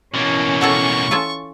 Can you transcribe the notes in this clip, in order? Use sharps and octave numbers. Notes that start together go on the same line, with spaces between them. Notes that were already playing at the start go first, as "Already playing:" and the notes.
B2 E3 A#3 C#4
F#4 A4 C#5 C#6
F4 A4 C#5